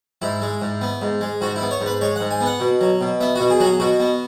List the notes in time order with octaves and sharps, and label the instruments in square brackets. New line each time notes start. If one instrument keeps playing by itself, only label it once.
[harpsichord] G#2 E4
G#3
G#2
B3
G#2
G#3
G#2 F#4
E4
B3
C#5
G#2
B4
G#3 C#5
G#2 F#5
G#5
B3
F#5
B2
F#3
B2
B3 E5
B2 F#4
G#4
F#3 F#4
G#4
B2 F#4
B3